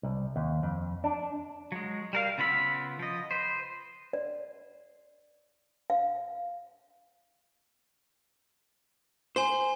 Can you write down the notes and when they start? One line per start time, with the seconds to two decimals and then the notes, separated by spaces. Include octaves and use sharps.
0.03 C2
0.36 D#2
0.63 F2
1.04 D4
1.72 F#3 G#3
2.13 G3 A#4 F5
2.38 C#3 B3 F4 B5 E6
2.99 F3 D#5
3.31 B4 C5
4.13 D5
5.90 F5
9.36 C5 G#5 C6 G7